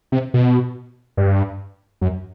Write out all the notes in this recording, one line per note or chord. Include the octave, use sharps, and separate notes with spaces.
C3
B2
G2
F#2